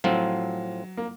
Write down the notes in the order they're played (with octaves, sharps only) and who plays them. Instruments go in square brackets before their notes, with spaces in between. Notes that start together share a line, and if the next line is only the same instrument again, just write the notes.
[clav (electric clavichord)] A2 F3 C4 F4 [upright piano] F#3
[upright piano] A#3